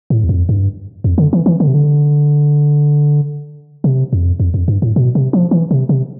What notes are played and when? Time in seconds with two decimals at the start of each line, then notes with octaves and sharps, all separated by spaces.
0.10 A2
0.24 E2
0.29 F2
0.49 G2
1.04 F2
1.18 D3
1.33 E3
1.46 E3
1.60 D3
1.68 C3
1.74 D3
3.84 C3
4.13 F2
4.40 F2
4.54 F2
4.68 G2
4.82 A2
4.96 B2
5.15 C3
5.33 F3
5.51 E3
5.71 C3
5.89 C3